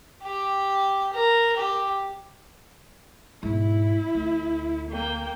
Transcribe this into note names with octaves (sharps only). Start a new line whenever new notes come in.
G4
A#4
G4
G#2 B2 E4
D2
A#3 G5